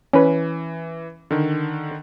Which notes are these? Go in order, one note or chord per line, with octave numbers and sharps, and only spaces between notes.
E3 C#4 B4
D3 D#3